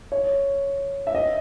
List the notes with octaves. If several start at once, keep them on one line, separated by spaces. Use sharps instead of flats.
C#5
E5
D#5